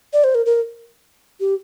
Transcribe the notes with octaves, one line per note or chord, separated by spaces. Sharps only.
D5
C5
A#4
A#4
G4